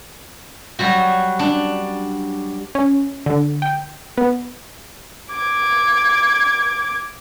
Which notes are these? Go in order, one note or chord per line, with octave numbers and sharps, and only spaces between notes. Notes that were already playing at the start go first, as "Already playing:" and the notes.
F#3 G3 F#4
D4
C#4
D3
G5
B3
D6 G#6